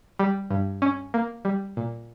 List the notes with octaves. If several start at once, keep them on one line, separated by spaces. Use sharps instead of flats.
G3
G2
C#4
A#3
G3
A#2